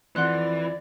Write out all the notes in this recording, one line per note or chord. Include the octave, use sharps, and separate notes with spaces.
F2 E3 D5 F#5 C6 F#6